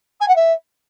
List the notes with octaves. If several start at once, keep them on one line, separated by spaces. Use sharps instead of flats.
G#5
F#5
E5